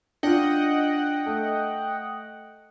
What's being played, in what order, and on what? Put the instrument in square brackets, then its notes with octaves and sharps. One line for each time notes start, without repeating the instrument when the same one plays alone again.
[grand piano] D4 F4 [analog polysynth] D#5 F#5 G5
[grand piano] A3